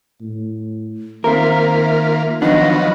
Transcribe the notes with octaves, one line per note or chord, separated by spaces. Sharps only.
A2
D#3 A#3 C4 F4 A#4 E5
D#3 F3 F#3 B3 D4 D#5